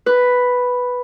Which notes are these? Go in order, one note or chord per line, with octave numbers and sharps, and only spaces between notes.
B4